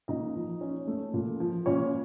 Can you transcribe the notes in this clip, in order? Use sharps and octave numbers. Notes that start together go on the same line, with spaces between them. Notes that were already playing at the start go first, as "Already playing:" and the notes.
A#2 D#4 D#5
F3
C#4
A3
A#2
F3
A#2 C#4 C#5